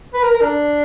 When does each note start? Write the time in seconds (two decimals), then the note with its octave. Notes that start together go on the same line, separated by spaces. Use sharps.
0.14 B4
0.23 A#4
0.33 A#4
0.41 D4